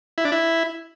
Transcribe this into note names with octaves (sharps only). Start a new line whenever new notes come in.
E4
D4
E4